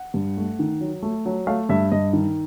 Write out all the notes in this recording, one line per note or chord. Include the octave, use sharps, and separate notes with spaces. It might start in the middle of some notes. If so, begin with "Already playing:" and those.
Already playing: F#5
G2
A3
D#3
F#3
A3
F#3
A3 F5
G2 E5
G2 D#5
D#3